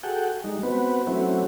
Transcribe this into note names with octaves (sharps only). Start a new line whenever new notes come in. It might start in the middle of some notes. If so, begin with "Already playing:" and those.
F#4 G#4 A4 F#5 G5
G3 G#3 D#4
B3 C4 F#4 B4
F#3 A3 C4 C#4 E4 F#4